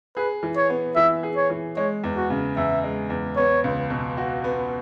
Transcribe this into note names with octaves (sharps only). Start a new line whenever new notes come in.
G#4 B4
E3
C#5
B3
E3 E5
G#4
C#5
E3
G#3 C#5
E2
F#4
C#3
E2 E5
G#3
E2
B3 C#5
C#2
B2
F#4
B3